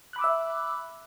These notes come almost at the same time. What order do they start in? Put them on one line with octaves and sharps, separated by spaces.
F#6 B5 D6 E6 E5